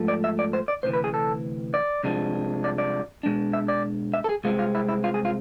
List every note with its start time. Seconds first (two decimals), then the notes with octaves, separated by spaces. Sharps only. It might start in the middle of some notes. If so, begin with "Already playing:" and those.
Already playing: G#2 F3 A3
0.08 D5
0.24 E5
0.39 D5
0.53 C5
0.68 D5
0.83 D2 C3 E3 C5
0.93 B4
1.04 G#4
1.14 A4
1.74 D5
2.03 C2 C3 F3 G#3 D4
2.64 D5
2.78 D5
3.23 B2 G#3 D4
3.53 E5
3.68 D5
4.13 E5
4.24 A4
4.29 G#4
4.44 C2 C3 G#3 C4 F4
4.59 F4
4.75 E4
4.89 E4
5.04 F4
5.14 G#4
5.25 F4